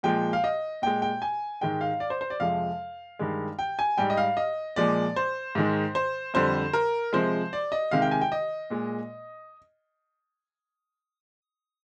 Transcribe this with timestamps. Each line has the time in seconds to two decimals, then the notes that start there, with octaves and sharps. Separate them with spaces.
0.03 A#2 F3 G#3 G5
0.33 F5
0.44 D#5
0.82 A#2 G#3 G5
1.02 G5
1.22 G#5
1.61 G#2 D#3 G#3 G5
1.81 F5
2.00 D5
2.10 C5
2.21 C5
2.30 D5
2.40 F2 C3 F3 G#3 F5
3.19 G2 D#3 G#3
3.59 G5
3.79 G#5
3.98 G#2 G3 G5
4.10 D#5
4.17 F5
4.37 D#5
4.76 A#2 F3 G#3 D5
5.16 C5
5.55 G#2 D#3 G#3
5.95 C5
6.34 F2 D3 G3 C5
6.73 A#4
7.13 C3 F3 G#3 C5
7.53 D5
7.72 D#5
7.91 C3 D#3 G#3 F5
8.02 G5
8.11 G#5
8.21 G5
8.32 D#5
8.70 A#2 G#3